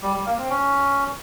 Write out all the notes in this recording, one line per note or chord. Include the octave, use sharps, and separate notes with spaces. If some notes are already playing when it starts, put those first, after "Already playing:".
G3
G3
A#3
C4
C#4